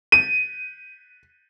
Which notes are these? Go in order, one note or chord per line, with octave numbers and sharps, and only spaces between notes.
D#7